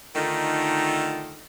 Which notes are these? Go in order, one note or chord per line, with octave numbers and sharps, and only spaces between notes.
D3 D#3 A3 D#4 F4 A#4